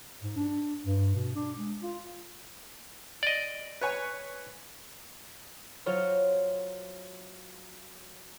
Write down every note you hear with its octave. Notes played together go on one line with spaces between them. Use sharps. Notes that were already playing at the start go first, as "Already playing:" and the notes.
G#2
D4
G2
B2
D4
G#3
F4
D5 D#5
B4 C#5 G#5
F#3 F4 C5 C#5